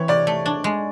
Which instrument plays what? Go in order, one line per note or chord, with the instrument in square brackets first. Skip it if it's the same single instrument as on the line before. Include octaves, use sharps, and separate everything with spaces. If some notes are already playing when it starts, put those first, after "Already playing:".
Already playing: [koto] E3 C4 [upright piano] C#5
[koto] C3 [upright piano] D5
[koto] A3
D4
G#3